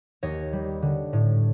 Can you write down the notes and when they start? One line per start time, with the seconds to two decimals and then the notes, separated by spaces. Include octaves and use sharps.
0.23 D#2 C#5 D#5
0.53 G3
0.82 D3
1.13 A2